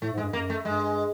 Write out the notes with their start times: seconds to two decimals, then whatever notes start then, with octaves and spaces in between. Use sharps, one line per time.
0.02 A2 A3
0.13 G#2
0.17 G#3
0.23 G2
0.33 F#2 A#3
0.50 A3
0.65 G2 G#3